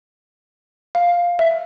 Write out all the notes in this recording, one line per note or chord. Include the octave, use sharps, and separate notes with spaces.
F5
E5